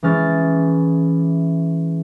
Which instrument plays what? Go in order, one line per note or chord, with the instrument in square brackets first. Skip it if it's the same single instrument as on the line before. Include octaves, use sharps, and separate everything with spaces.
[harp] E3 G#3 C#4 F6 A6